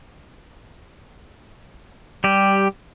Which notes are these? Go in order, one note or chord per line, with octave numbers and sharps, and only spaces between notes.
G3 G4